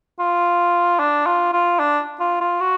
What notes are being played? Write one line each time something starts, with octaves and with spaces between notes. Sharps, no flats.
F4
D4
F4
F4
D4
F4
F4
F#4